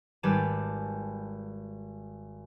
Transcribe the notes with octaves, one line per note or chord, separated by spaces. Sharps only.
G#1 G3 G4 B4 G#5 A5